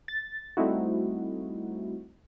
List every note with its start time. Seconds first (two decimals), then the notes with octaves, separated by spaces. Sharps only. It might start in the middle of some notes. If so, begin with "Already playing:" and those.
0.08 A6
0.57 G3 A3 C4 D#4 E4 F#4